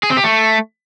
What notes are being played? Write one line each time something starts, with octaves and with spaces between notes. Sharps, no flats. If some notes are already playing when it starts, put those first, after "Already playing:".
G#4
C4
G4
A3